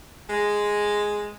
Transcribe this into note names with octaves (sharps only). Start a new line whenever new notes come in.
G#3